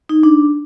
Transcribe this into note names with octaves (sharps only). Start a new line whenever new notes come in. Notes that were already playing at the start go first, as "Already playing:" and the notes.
D#4
D4